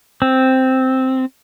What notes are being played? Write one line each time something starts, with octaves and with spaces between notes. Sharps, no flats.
C4